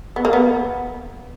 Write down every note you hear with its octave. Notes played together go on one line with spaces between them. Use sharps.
B3
A#3
B3